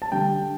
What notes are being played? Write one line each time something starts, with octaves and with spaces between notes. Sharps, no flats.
A5
D3 G3 G5